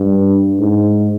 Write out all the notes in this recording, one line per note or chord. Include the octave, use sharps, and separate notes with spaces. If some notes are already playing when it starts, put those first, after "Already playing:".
Already playing: G2
G#2